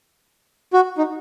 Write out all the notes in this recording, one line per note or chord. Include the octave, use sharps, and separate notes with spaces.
F#4
D#4